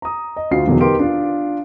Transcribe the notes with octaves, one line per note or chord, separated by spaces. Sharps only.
A#5 D#6
D#5
D2 D4 F4 F#4 C7
E2 B2 D3 D#3 F#3
B3 D#4 G4 A#4 C6 D7
D4 F4